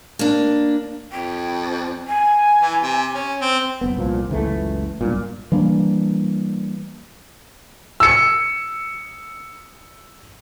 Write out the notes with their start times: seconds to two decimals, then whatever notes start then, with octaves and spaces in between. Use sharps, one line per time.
0.19 A#3 D4
1.11 F2 G5
2.07 G#5
2.61 E3
2.83 C3
3.14 C#4
3.41 C4
3.81 F#1 B3
3.96 C2 A#2 F3
4.29 F#1 C#2 E3 A3
5.01 B1 G2 A#2
5.52 E3 G3 A#3 D4
8.00 E6 C#7